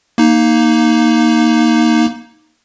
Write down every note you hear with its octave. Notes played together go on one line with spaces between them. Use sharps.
A#3 D#4